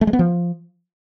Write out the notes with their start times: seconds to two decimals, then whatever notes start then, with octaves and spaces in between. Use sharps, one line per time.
0.01 A3
0.07 G#3
0.13 B3
0.19 F3